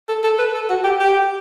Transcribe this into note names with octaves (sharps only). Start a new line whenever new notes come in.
A4
A4
B4
A4
F#4
G4
G4